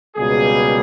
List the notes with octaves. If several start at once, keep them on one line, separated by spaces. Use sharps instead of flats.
C#2 B2 G3 A#3 G#4